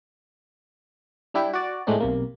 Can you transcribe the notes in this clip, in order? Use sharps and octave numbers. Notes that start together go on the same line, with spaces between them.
G3 D4 E4 G4 G5
F#4 D5
A2 G#3 A3 C4 D4 D#4
B1 C3 A#3